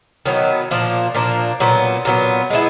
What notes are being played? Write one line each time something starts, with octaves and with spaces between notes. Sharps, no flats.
D#3 F#3 B3
A#2 F3 A#3 D4
A#2 F3 A#3 D4
A#2 F#3 B3
A#2 F#3 B3
G#3 B3 E4